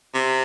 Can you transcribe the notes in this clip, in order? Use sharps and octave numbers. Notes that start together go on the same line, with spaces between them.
C3